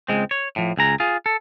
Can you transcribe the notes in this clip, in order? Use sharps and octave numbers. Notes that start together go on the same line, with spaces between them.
C#2 G#3 C4
C#5
A2 F3
C#2 G#4 A#5
F4 G#4
A4